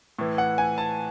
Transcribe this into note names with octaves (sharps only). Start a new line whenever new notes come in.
A2 E3
F#5
G#5
A5